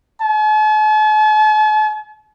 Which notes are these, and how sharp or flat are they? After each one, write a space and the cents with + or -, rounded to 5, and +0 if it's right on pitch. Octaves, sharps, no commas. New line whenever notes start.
A5 -45